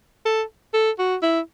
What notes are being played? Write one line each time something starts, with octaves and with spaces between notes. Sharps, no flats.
A4
A4
F#4
E4